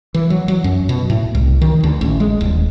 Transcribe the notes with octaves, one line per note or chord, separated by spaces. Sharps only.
E3
F#3
F#3
F#2
B2
A2
C2
D#3
D2
A1
G#3
D#1